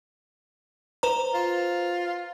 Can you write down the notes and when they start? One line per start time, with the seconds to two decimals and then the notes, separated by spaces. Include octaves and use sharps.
1.03 B4 C5 A#5
1.34 F4